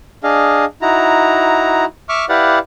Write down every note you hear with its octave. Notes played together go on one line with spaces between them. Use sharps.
D4 G#4 D#5 F5
D#4 E4 F#4 A#5
E5 C#6 D6 F6
E4 G4 B4 D5 F5 F#5